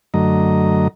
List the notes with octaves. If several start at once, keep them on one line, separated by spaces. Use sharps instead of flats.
F#2 D3 F#3 A3 D#5 A#5